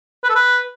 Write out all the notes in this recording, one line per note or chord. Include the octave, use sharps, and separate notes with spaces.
B4
A4
B4